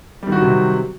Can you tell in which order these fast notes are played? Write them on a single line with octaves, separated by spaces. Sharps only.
G3 D#3 F#4 F#3 C3